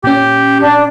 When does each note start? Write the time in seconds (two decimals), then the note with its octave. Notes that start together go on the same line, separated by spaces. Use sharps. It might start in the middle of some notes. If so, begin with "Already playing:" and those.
0.04 A#2 C#4 G4
0.60 D4